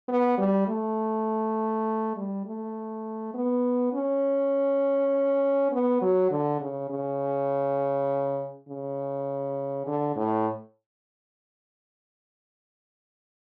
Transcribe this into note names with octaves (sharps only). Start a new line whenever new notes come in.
B3
G3
A3
G3
A3
B3
C#4
B3
F#3
D3
C#3
C#3
C#3
D3
A2